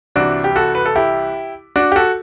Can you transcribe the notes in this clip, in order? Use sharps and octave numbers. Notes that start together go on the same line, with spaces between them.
C2 C3 E3 D4 F#4
G4
F#4 A4
B4
A4
E4 G4
D4 F#4
G4
F#4 A4